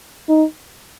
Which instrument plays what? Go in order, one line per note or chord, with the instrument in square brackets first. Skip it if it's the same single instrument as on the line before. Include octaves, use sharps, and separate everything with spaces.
[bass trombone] D#4